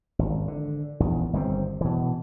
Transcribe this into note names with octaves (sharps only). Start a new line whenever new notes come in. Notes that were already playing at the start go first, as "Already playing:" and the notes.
G#1
D3
A#1 E2
G1 D#3 G3 C4
B2 E3